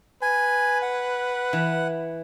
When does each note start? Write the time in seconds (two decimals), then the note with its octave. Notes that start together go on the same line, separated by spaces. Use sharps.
0.22 B4 G#5
0.82 F#5
1.53 E3